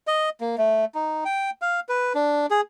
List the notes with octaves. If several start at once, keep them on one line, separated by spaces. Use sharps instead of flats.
D#5
A#3
A3
D#4
G5
F5
B4
D4
G#4